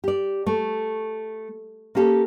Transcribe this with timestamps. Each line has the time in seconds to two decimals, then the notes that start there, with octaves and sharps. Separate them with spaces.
0.04 G4 D5
0.46 A3
1.95 A#3 C#4 G4 A4